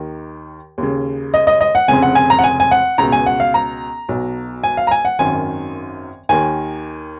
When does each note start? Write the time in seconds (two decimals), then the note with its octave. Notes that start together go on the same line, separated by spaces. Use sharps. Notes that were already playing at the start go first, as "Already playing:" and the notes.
Already playing: D#2 D#3
0.78 D#2 C#3
1.34 D#5
1.47 D#5
1.61 D#5
1.75 F#5
1.88 F1 F2 C#3 G#5
2.02 F#5
2.15 G#5
2.30 A#5
2.39 F#5
2.44 G#5
2.60 G#5
2.71 F#5
2.98 C#2 B2 A#5
3.12 G#5
3.26 F#5
3.40 F5
3.54 A#5
4.09 B1 B2
4.64 G#5
4.77 F5
4.87 A#5
4.91 G#5
5.05 F#5
5.19 G#1 F#2 D#3 G#5
6.29 D#2 D#3 G#5